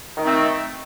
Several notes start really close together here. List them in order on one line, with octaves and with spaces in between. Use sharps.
D#3 A3 C4